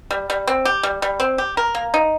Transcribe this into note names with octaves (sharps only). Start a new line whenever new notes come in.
G3
G3
C4
G4
G3
G3
C4
G4
A#4
A#3
D#4